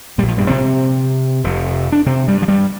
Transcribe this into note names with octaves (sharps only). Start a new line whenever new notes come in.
A#1 A#2 G3
F3
G2 G3
C3 C4
F1 F2 C3
D4
C3 C4
G2 G3
F3
G2 G3